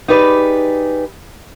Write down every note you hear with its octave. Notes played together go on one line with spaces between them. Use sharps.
D#4 G4 G#4 B4 D5